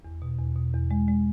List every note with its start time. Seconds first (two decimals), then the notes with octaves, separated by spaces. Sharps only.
0.05 E2
0.22 B2
0.38 E2
0.56 B2
0.74 E2
0.91 G#3
1.08 G#3